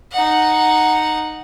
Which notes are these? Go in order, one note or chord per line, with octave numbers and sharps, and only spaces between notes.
D#4 F#5